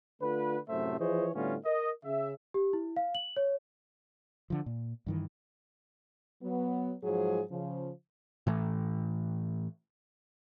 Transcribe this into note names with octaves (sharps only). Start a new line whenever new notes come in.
D3 A3 F4 B4
F#2 A2 C3 A3 C5 E5
E3 F3 G#4 C5 C#5 D#5
A2 D3 G3 B3 C#4 F4
A#4 D#5
C#3 E5
G4
E4
F5
F#7
C#5
D3 F3
A#2
G2 D#3 E3
F#3 B3
G#2 F3 F#3 G#4
C#3 F3
A2 E3 A3